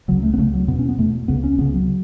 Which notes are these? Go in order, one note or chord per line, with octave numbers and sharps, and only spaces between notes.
C#2 C#3 F#3
A3
B3
C#2 C#3 A3
F#3
E2 B2 B3
C#4
B3
E2 B2 A3
C#2 C#3 B3
C#4
C#2 C#3 B3
F#3